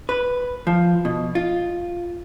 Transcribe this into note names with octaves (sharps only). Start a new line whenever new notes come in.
B4
F3
B2
F4